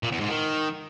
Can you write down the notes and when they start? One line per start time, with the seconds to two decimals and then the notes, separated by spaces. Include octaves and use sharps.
0.03 A#2
0.12 E2
0.20 G#2
0.29 D#3